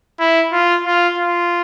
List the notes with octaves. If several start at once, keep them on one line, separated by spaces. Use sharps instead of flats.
E4
F4
F4
F4